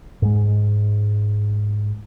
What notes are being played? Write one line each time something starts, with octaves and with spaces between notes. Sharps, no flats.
G#2 G#3